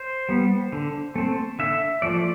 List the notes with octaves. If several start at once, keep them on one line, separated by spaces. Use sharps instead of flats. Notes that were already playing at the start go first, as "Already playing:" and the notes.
Already playing: C5
G3 B3
D3
A3 C4
D3 E5
F3 A3 D5